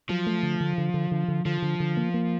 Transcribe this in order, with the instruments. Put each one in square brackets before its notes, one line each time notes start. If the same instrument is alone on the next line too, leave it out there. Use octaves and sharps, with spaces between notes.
[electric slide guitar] F3 [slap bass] F#3
[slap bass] A3
D3
D3
D3
D3
D3
D3
[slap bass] D3 [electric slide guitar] F3
[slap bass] D3
D3
A#3
A#3